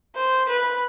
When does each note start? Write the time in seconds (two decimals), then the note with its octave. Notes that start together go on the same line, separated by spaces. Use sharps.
0.16 C5
0.49 B4